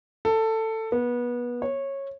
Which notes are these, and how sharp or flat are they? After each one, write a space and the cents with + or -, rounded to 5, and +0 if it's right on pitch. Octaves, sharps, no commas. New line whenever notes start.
A4 +15
B3 -25
C#5 -15